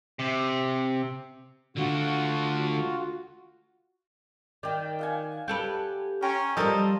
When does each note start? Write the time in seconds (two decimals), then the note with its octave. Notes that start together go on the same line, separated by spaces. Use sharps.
0.19 C3
1.77 D3 A3 F4 F#4
4.63 D#3 D5 G5
4.99 F5 F#5 G#5
5.48 G4 A4 B4
6.22 C#4 G5 A#5 C6
6.57 F3 G3 A4 A#4 C5 D#5